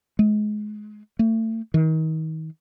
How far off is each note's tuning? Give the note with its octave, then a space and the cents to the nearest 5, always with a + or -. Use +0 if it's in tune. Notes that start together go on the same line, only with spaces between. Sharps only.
G#3 +25
A3 +30
D#3 +35